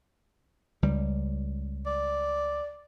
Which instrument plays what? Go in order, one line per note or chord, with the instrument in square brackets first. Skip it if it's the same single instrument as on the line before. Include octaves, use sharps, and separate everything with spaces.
[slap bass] C#2 G3
[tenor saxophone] D5